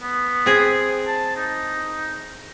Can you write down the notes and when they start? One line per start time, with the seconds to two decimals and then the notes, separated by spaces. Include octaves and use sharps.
0.02 B3
0.46 C4 G#4
1.07 A5
1.36 D#4